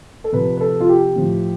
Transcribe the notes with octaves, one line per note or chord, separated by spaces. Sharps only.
A4
C3 F3 B4
B4
A4
F4
G4
A2 F3